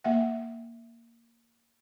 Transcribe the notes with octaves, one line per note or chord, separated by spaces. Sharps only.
A#3 E5 F#5